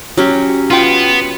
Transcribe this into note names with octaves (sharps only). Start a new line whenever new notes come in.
F#3 C#4 G4
B3 F4 G5